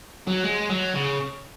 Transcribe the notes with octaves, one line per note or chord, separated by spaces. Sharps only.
F#3
G#3
F#3
C#3